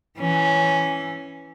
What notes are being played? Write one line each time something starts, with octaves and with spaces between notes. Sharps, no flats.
E3 C#4